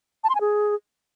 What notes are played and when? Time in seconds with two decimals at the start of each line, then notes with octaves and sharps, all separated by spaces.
0.24 A5
0.29 C6
0.35 G#5
0.41 G#4